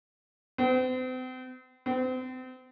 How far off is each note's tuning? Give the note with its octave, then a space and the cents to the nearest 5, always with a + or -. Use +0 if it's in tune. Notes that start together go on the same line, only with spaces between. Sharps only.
C4 -40
C4 -35